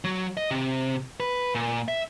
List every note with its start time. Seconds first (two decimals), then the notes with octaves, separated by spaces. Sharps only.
0.04 F#3
0.37 D#5
0.51 C3
1.20 B4
1.55 A#2
1.88 E5